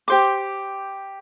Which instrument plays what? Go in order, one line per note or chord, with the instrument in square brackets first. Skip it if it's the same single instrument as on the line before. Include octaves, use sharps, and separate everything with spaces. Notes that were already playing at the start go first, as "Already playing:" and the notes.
[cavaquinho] G4 C5 D6